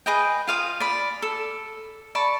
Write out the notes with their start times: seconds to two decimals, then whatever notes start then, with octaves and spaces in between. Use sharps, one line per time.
0.06 G#4 B4 D#5 G5
0.47 F4 F5 D#6
0.80 D5 B5
1.22 A4
2.15 D5 A5 B5 C#6